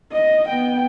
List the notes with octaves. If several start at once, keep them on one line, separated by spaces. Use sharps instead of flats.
D#5
B3 G5